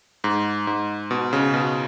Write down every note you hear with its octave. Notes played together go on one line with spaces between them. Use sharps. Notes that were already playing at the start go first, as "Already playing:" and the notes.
G#2
G#2
B2
C#3
B2